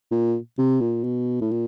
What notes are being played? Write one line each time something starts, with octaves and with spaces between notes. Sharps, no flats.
A#2
C3
A#2
B2
A2
A#2